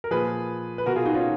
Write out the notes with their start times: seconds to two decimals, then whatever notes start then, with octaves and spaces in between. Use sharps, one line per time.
0.04 A#4
0.11 A#2 F3 G#4 B4
0.78 B4
0.86 B2 F#4 A#4
0.96 F4 G#4
1.05 D#4 F#4
1.15 C#4 F4